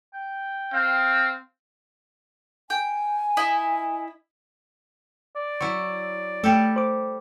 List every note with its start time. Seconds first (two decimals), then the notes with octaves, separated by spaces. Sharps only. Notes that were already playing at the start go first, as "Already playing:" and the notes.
0.14 G5
0.74 C4 F5
2.70 G5 G#5
3.37 E4 D#5
5.36 D5
5.61 F#3 E4 C#6
6.44 G3 A3 G4 A4
6.76 C5 D6